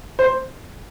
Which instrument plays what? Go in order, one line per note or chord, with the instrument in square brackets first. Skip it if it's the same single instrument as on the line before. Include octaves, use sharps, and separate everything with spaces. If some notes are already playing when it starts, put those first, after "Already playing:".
[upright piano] C5